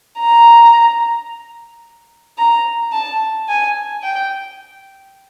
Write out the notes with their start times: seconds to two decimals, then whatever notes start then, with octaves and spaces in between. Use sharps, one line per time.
0.19 A#5
2.38 A#5
2.92 A5
3.48 G#5
4.03 G5